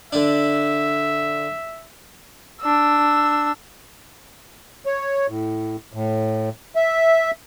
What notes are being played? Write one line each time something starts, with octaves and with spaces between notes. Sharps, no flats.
D3 D4 E5
D4 E6
C#5
A2
A2
E5